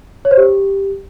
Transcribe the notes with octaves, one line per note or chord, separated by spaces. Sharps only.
C#5
C5
G4